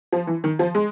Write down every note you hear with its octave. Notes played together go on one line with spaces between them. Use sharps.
F3
E3
D#3
F3
G#3